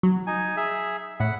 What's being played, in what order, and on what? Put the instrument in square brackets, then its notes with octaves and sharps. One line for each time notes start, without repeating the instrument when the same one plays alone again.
[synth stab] F#3
[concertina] D#4 G#5
G#4 E5
[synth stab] A2 [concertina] F#5 B5